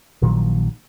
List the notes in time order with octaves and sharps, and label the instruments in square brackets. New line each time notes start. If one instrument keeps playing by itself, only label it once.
[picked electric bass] A#1 A#2 D#3 F#3